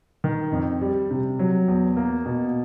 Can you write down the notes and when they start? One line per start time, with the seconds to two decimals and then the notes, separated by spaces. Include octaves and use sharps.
0.24 D#3
0.52 F2
0.81 G3
1.11 C3
1.39 F#3
1.68 E2
1.97 A#3
2.26 B2